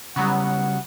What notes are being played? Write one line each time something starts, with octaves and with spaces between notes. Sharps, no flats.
C#3 F#3 G3 B3 F#4 F#5